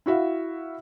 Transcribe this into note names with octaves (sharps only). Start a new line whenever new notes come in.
E4 F#4 E5 F5